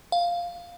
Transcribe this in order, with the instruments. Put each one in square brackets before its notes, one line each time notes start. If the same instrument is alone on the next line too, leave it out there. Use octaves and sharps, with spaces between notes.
[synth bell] F5